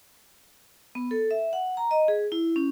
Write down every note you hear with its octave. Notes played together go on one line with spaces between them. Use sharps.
B3
A4
E5
F#5
A#5
D#5
G#4
E4
C#4